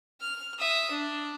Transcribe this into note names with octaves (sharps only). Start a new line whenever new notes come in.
F6
E5 D#6
D4